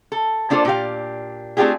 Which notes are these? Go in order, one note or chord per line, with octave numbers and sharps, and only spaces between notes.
A4
A#3 D4 F4 A4 C5
A#2 D4 G4 F5
A3 C4 D4 F4 G4 G#4